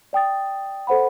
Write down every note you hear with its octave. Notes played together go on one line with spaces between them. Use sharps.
D5 G5 D#6 A6
A4 C5 F#5 B5